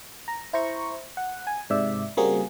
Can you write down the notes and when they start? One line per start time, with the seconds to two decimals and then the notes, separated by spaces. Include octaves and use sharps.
0.28 A#5
0.53 E4 C5 A#5 C#6
1.17 F#5
1.47 G#5
1.70 G#2 C3 D5 E5
2.17 C#3 G3 A#3 C4 F#4 G#4